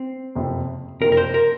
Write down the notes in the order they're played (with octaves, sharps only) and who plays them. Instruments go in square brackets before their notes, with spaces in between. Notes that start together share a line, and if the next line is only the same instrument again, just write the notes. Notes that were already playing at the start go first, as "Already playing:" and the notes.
Already playing: [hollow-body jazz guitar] C4
[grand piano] F#1 F2 C3
[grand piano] F#1 F2 C3 [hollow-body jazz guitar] A#4
[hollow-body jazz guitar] A#4
C5
A#4